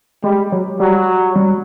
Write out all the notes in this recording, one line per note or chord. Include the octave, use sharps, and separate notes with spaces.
G3 G#3
F#3
F#3 G3
G3